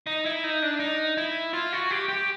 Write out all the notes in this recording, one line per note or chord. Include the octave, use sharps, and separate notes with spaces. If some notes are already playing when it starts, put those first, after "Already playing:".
D#4
E4
D#4
D4
D#4
E4
F4
F#4
G4
G4